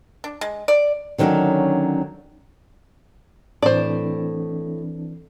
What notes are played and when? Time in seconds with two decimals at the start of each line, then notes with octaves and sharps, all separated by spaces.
0.24 D4
0.41 G#3
0.68 D5
1.18 D3 D#3 F#3 G3 C#4 D4
3.63 A2 E3 C4 D4 C5 D5